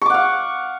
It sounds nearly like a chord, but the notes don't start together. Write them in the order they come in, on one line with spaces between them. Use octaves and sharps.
C#6 D6 F#5 F5